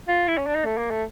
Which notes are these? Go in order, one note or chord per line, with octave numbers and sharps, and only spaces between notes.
F4
E4
C#4
D4
D#4
A3
A#3
A3